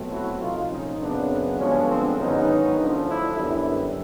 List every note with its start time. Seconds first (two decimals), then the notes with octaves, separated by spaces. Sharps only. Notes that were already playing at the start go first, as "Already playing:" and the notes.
Already playing: B2 F#3 A3 C4
0.11 E4 F#4
0.41 C2 A#2 F3 D#4 F4
0.71 C#4 D#4
1.00 F#2 C#3 F#3 B3 C4 D4
1.59 G2 D3 F3 G#3 B3 C#4
1.88 C4 D4
2.18 G#2 D#3 F#3 B3 C#4 D#4
2.78 D2 D3 F3
3.07 D4 E4
3.37 F#2 D3 G3 B3 D4 E4